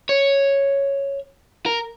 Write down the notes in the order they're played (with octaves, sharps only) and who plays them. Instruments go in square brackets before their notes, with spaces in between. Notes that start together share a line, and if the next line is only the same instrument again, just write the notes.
[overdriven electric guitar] C#5
A#4